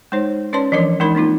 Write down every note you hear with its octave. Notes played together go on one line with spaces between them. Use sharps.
G#3 D#4 C5 C#5
C#4 B4 C#5 D5 A5 C6
E3 F3 D4 A#4 C#5 D6
E3 G#3 D4 D#4 A#4 B5
A#3 C4 D#4 F4